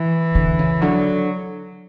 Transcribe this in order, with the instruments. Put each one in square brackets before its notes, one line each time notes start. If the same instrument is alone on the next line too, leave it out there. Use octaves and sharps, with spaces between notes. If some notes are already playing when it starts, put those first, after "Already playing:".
Already playing: [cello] E3
[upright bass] D3
C#3
[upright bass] D3 [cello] F#3